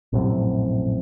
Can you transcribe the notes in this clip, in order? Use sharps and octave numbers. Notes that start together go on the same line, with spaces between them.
A#1 F#2 A2 C3